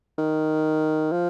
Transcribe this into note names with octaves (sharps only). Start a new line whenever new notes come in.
D#3
F3